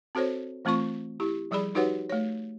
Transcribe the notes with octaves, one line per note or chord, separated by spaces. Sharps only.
C4 F#4 A4 C5 C#5
E3 A3 C4 F4 C#6
E4 G4
F3 G3 G#4 D5 B5
D#4 F#4 G4 B4 C#5 F#5
A3 C#5